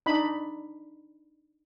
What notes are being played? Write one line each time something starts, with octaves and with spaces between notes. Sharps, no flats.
D4 D#4 B5